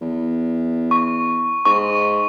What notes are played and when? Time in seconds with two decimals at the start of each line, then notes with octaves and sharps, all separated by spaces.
0.01 E2
0.91 C#6
1.65 G#2 C#6